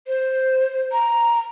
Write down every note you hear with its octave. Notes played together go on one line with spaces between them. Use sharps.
C5
A#5